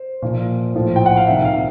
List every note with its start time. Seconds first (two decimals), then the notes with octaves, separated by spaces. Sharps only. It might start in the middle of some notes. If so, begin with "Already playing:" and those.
Already playing: C5
0.22 A#2 F3
0.74 A2 F3
0.96 G5
1.06 F#5
1.17 F5
1.27 C3 D#3 E5
1.45 F5